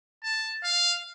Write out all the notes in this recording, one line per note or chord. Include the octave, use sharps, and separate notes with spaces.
A5
F5